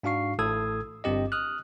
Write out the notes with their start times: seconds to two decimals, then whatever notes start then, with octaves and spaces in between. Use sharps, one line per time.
0.03 G#2 D4 F#4 F5 C#6 C7
0.39 A1 A2 A4 D#6 E6 G#6
1.04 G1 G2 C4 G4 D#5
1.32 D#6 F6 F#6